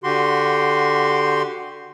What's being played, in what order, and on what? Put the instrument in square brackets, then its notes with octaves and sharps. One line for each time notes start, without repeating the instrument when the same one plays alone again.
[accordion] D3 F#4 G4 C6